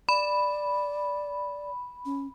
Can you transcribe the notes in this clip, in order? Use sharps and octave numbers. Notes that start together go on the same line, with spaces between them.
D5 B5
C#4